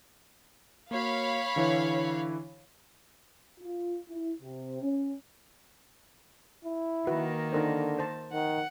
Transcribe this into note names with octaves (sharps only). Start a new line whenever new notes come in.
A#3 F#4 C#5 F5 B5
D3 E3 E4
F4
E4
C3
C#4
E4
D#3 A#3 F#4 B4 F#5
D3 D#4 A#4 C5
C5 A5
D#3 F#5